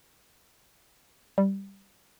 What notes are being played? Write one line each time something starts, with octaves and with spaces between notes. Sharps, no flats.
G3